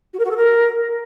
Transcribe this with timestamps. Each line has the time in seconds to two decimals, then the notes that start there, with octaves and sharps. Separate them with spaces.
0.13 F#4
0.19 A#4
0.25 F#4
0.31 A4
0.37 A#4